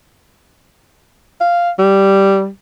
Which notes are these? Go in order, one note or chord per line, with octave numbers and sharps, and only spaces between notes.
F5
G3